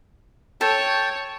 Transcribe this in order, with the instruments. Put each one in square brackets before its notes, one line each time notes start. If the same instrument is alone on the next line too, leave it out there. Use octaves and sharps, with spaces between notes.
[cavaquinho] A4 [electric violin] C#5 [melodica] G5 A5